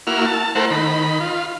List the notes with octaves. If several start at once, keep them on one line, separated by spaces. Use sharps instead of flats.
A#3 E4 F#4 F6
A5
A3 E4 A#4 C5 F#5
D#3 B5
F4